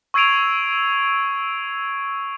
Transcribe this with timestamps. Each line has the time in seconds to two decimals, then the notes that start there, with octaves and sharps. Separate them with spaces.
0.14 C#6 E6 G#6 C7 D7 F7